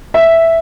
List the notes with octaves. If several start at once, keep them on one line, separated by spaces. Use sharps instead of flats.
E5